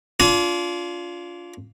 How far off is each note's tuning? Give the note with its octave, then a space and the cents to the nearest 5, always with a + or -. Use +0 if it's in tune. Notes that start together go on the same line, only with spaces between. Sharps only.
D4 -25 F4 +0 G#5 +30